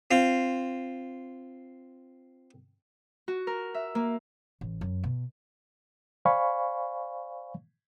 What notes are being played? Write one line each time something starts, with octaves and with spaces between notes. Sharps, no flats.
C4 F4
F#4
A#4
E5
A#3
A1
F#2
B2
C5 D5 F5 G#5 B5 C#6